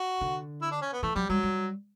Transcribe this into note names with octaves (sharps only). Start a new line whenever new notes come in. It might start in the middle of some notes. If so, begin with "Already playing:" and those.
Already playing: F#4
D3
E4
D4
C#4
B3
E3 A3
F#3 G3
F#3 G3
G3